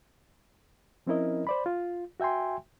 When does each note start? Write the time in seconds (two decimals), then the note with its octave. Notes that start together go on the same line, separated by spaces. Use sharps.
1.07 F3 C4 C#4 E4 A#4 D#5
1.47 C5 D5 B5
1.66 F4
2.20 F#4 E5 G5 G#5 C6